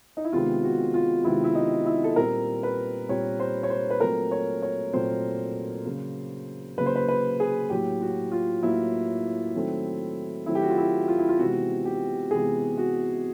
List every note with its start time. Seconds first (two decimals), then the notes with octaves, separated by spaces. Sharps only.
0.17 D#4
0.24 E4
0.33 C3 D#3 G#3 B3 F4
0.63 F#4
0.94 F4
1.24 C3 D#3 G#3 B3 E4
1.44 E4
1.55 D#4
1.86 E4
2.04 A4
2.16 A#2 G3 C4 A#4
2.63 B4
3.09 A#2 G3 C4 C#5
3.40 C5
3.63 C#5
3.70 C5
3.90 B4
4.00 A#2 F#3 A3 C4 A#4
4.31 C#5
4.62 C#5
4.93 A#2 F#3 A3 C4 C5
5.86 C#3 F#3 A#3
6.78 C#3 F#3 A#3 B4
6.86 C5
6.96 B4
7.09 B4
7.40 G#4
7.70 A2 F#3 A#3 G4
8.01 F#4
8.32 F4
8.62 A2 F#3 A#3 E4
9.55 D#3 F#3 A3 C4
10.46 D#3 F#3 A3 C4 E4
10.55 G4
10.62 F#4
10.70 F4
10.77 E4
11.08 F4
11.19 E4
11.29 F4
11.39 C3 E3 G#3 B3 F#4
11.85 G4
12.31 C3 E3 G#3 B3 G#4
12.78 F#4